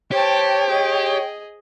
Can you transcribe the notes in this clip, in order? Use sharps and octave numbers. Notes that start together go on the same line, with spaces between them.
G4 C5 C#5 G5 A5
G#4 D#5